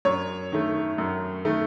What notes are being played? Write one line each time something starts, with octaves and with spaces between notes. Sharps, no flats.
F#2 C#5
D#3 A3
F#2
D#3 A3